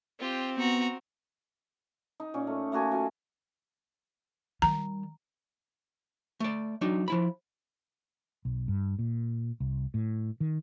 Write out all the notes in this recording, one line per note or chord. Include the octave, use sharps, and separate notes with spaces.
C4 F4 G4
B3 F#4 A#5
D#4
A#2 C#4
A3
A3 A#3 F#4 G#5
F#3 F4
D#3 G3 A#5
A3 D5
F#3 D4 D#4
F3 E4 B5
B1
G2
A#2
C2
A2
D#3